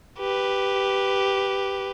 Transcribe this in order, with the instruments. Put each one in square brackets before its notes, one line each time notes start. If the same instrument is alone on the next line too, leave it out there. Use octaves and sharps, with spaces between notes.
[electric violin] G4 B4